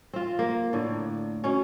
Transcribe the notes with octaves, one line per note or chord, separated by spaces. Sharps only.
C4 F4
A#3
A2 D3
B2 C#4